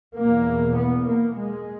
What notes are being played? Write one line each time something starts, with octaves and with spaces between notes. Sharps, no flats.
E2 B2 A#3
B3
A#3
G#3